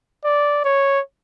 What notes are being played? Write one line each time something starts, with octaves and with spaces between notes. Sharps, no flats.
D5
C#5